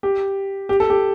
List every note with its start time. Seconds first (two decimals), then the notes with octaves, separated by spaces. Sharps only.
0.03 G4
0.69 G4
0.80 A4
0.90 G4